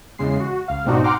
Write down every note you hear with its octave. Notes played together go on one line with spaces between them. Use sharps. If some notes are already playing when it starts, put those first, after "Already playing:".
E2 C#3 G#3 C7
F#4
C#2 F5
G#2 B2 C4 D4 D#4 F#4
F#5 G5 A#5 C6 D6 F6